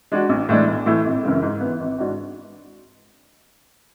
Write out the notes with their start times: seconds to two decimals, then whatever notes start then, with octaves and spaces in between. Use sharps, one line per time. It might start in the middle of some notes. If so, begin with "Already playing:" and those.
0.12 G#3 D4 F#4
0.29 A1
0.49 A2 E3 G#3 D4
0.67 B1
0.86 A2 E3 A3 E4
1.05 G#1
1.23 F#2 C#3 E3 G#3
1.42 G#2
1.61 E3 B3
1.80 G#1
1.98 G#2 G#3 D4 F#4